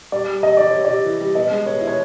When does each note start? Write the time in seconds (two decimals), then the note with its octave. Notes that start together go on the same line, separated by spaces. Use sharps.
0.12 G3 D5
0.28 G3
0.43 C3 D#5
0.57 C3 D5
0.71 C3 C#5
0.85 C3 D5
1.05 E3
1.21 G3
1.35 B3 D#5
1.51 G#3
1.66 B3 C#5
1.81 E4
1.87 C#5